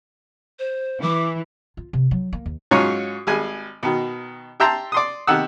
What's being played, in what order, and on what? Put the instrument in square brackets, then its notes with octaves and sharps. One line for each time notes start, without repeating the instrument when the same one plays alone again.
[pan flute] C5
[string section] E3 [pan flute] D6
[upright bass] F4
C3
F#3
A#3
D#2
[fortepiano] G#2 F#3 C#4 F4 C#5 A#5
G#1 G3 G#4 G#5
B2 D#3
G4 E5 G5 A5 A#5 C6
D5 C6 D#6
C3 D#3 F#5 E6